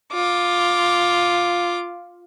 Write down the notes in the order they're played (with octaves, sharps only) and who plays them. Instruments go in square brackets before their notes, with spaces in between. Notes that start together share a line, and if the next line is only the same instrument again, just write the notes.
[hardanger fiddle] F4 D6